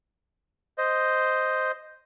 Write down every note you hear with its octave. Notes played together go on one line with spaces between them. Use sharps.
C5 D#5